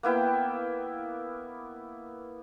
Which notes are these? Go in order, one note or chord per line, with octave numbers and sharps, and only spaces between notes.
A#3 B3 E4 G5